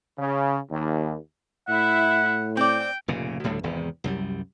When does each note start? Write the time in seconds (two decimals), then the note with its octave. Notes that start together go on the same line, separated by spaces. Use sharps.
0.19 C#3
0.70 D#2
1.69 A2 E4 E5 F#5
2.57 C4 D5 G5
3.08 F1 A#2 C#3
3.44 D2 A2 D3 G3
3.63 G#1 E2 C3
4.04 C2 F#2 G3